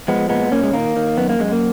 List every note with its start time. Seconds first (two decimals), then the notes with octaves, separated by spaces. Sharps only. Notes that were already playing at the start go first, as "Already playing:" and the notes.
0.08 F3 G#3 B3
0.29 A#2 G#3 B3
0.51 A#2 A#3 C#4
0.64 G#3
0.73 D#3 A#3
0.96 D#3
1.18 F#2 B3
1.29 A#3
1.39 F#2 G#3
1.52 A#3